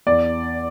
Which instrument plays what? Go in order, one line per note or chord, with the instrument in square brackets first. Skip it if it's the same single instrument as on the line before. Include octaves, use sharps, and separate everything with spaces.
[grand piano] E2 D5